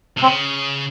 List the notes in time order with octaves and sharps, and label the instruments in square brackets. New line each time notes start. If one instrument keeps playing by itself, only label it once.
[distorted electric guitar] C3
[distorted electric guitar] C#3 [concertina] C4